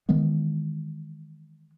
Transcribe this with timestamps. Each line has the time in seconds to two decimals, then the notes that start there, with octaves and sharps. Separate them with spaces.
0.09 D#3 E3 G#3 B3